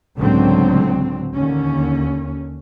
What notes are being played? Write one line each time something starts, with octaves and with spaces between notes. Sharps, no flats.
C#2 A2 D3 F#3 C4
D#2 D3 C#4